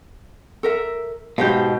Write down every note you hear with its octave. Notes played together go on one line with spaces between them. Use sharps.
A4 A#4 E5
G#2 B2 G4 C5 F5